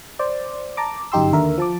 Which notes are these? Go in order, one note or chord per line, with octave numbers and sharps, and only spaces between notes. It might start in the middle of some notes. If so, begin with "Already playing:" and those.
C5 D5
A5 A#5 D6
G1 F#2 D#4 G4 C6 E6
D#2 D3 A#4 E5
F3 A5 D6